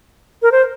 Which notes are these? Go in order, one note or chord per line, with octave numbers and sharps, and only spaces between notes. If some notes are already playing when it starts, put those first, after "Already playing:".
A#4
C5